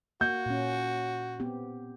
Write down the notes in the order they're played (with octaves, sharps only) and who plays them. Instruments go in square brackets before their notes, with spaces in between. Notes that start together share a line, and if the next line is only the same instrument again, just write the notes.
[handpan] A#3 [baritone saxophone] F#4 [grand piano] G6
[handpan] A#2 C#4
B3 C4 G4